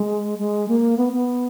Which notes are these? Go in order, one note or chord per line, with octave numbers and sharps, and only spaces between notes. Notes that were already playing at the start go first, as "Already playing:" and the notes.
Already playing: G#3
G#3
A#3
B3
B3